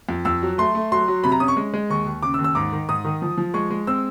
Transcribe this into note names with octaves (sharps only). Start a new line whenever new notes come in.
F2
F2 E6
F#3
A3 C6
A3
F#3 C6
F#3
C3 B5
A#5
C#4 D#6
C#6
G#3
G#3
D#2 C#6
D#2
C#3 D6
E6
D#2
E6
G#2 D6
D#3
G#2 D#6
D#3
F3
F3
G#3 C#6
G#3
C4 E6